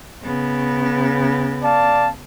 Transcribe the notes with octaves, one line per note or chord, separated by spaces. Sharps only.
C#3 B3
D5 F5 A5